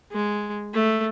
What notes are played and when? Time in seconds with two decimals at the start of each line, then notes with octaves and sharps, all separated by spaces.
0.12 G#3
0.74 A3